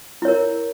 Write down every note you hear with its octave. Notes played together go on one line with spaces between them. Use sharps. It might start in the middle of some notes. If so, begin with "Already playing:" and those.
E4 A#4 C#5